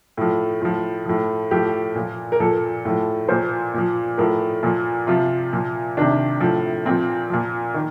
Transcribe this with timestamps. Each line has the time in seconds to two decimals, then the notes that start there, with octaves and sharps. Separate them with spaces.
0.17 A2 F3
0.61 A2 F3 F4
1.06 A2 F3
1.51 A2 F3 G4
1.95 A#2 F3
2.32 A#4
2.40 A#2 F3 A4
2.85 A2 F3
3.28 A#2 F3 C5
3.74 A#2 F3
4.18 A2 F3 A#4
4.63 A#2 F3
5.07 C3 F3 F4
5.53 A#2 F3
5.97 C3 D#3 D4
6.41 A2 F3
6.85 A#2 F3 C4
7.30 A#2 F3
7.74 D#3